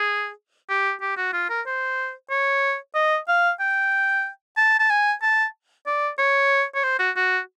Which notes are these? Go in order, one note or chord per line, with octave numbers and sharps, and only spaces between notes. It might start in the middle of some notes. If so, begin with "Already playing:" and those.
Already playing: G#4
G4
G4
F#4
F4
A#4
C5
C#5
D#5
F5
G5
A5
A5
G#5
A5
D5
C#5
C#5
C5
F#4
F#4